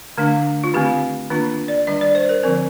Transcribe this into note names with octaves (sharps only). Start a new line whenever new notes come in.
D3 A3 D4
F4
D#3 A3 C4 G4
D#3 A#3 D4 F4
D5
D#3 G3 D4 D#5
D5
C5
A#4
D3 F3 C4 A#4